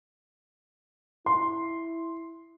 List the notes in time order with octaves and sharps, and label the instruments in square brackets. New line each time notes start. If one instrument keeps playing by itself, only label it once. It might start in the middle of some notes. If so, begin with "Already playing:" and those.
[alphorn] E4 [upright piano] C6